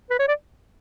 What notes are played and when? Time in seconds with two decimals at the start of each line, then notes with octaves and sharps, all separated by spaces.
0.10 B4
0.19 C#5
0.28 D5